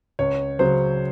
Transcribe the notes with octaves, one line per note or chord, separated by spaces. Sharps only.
C#2 C#5
C#3 F#3 C5